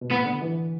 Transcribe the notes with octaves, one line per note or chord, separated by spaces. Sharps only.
B2
A2 B3
D3
E3